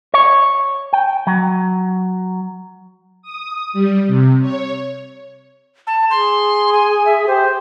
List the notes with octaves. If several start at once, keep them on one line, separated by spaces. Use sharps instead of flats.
C#5
G5
F#3
D#6
G3
C3
C#5
A5
G#4 C6
G#5
E5
G4 C5